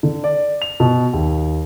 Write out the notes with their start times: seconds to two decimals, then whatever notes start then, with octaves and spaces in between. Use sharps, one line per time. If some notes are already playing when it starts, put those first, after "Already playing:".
0.03 D3
0.24 D5
0.62 F7
0.80 B2
1.13 D#2